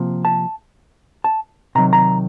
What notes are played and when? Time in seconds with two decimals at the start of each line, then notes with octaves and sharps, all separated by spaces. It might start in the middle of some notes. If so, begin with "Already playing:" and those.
Already playing: C3 F3 A#3
0.25 A5
1.24 A5
1.75 C3 D#3 F#3 A#5
1.93 A#5